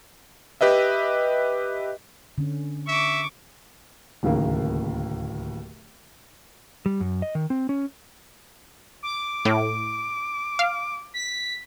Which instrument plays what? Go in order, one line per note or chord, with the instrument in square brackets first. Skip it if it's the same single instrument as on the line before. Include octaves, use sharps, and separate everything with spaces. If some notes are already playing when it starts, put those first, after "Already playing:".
[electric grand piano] G4 B4 D#5 E5
[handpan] D3 C#4
[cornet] E5 [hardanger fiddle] C#6 D6
[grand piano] D1 D#2 C#3 A#3
[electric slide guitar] G3
F#2
D#5
D#3
C4
C#4
[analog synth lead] D6
[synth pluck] A2
F5
[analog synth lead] B6